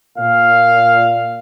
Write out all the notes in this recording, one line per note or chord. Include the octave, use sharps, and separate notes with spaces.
A#2 F5